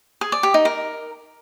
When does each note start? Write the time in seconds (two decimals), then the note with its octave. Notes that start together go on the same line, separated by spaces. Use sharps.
0.21 G#4
0.32 D5
0.43 G4
0.54 D#4
0.65 A#4